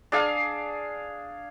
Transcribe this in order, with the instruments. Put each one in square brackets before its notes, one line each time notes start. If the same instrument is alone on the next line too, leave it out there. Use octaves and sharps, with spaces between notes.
[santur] D4 G#4 F5